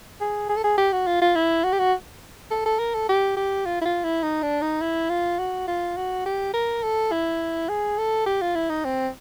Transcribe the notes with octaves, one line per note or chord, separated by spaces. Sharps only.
G#4
G#4
A4
G#4
G4
F#4
F4
F4
E4
F#4
G4
F#4
A4
A4
A#4
A4
G4
G4
F4
E4
F4
E4
D#4
D4
D#4
E4
F4
F#4
F4
F#4
G4
A#4
A4
E4
G#4
A4
G4
F4
E4
D#4
C4